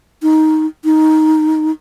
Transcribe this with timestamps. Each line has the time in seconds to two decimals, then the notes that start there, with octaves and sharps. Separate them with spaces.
0.23 D#4
0.85 D#4